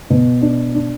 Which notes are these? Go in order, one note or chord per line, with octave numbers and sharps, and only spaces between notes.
B2
D4
D4